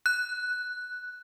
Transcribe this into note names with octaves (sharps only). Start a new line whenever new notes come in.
F#6